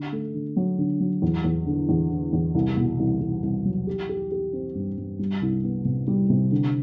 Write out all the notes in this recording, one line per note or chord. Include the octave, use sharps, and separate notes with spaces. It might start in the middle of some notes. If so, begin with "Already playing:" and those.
Already playing: D3
A3
D3
F#3
D3
F#3
E2
E2
D3
E2
D3
E2
C2
B2
C2
C2
C2
F#3
G4
G4
G4
C4
G2
G2
G3
C2
B3
C3
G3
C3
D3